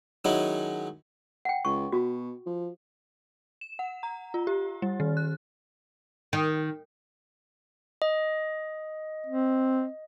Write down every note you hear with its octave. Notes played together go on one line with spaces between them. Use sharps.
D#3 F#3 G#3 C#4 D#4 E4
F#5 G5
C#2 C#6
B2 F#4
F3
E7
F#5
A#5
F4
G4
G3
D#3
F#6
D#3
D#5
C4